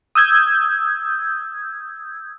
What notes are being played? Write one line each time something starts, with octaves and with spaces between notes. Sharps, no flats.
D#6 E6 G6 G#6